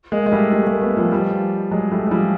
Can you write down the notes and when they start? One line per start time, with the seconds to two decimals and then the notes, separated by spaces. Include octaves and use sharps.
0.12 G#3 A#3
0.26 G#3
0.32 G3 A3
0.52 G3 A3
0.62 A3
0.67 G#3 A#3
0.81 A3 B3
0.97 F3 G3
1.12 F3 G3
1.71 F#3 G#3
1.92 G3 A3
2.07 G#3
2.11 F3 G3